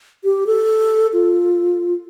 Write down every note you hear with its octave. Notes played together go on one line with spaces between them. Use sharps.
G4
A4
F4